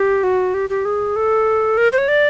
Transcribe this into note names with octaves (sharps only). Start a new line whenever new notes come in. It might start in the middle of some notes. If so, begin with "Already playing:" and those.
Already playing: G4
F#4
G4
G4
G#4
A4
A#4
C5
C#5
D5